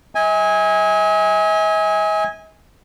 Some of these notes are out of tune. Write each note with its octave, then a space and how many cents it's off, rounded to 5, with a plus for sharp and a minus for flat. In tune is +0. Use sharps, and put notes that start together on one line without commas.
D#5 +45 G#5 -10